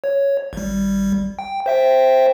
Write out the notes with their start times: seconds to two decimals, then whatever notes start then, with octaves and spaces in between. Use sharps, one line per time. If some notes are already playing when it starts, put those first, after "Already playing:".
0.04 C#5
0.53 G#1 G3
1.39 G5
1.66 C5 E5 G5